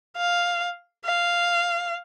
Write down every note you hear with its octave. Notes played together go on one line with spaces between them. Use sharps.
F5
F5